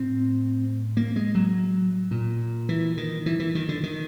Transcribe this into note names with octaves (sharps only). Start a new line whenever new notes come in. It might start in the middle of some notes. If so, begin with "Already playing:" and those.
Already playing: A2 C4
A#3
G#3
F#3
A#2
E3
D#3
E3
E3
D#3
D3
D#3